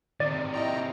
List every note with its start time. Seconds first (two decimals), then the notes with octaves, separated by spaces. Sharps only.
0.20 C3 D#3 D5
0.54 E4 D#5 G5 A#5